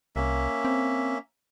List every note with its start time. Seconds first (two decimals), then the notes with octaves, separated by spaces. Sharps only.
0.16 C2 A#3 C#4 E5
0.65 C4